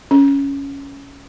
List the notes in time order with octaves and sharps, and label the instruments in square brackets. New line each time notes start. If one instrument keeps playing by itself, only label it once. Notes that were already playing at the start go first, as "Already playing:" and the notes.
[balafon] C#4